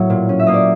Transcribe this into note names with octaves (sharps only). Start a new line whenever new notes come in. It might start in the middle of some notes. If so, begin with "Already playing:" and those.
Already playing: A2 F#3 A#3 C#5
A#2
C#4
E5
A#3 D#5
D5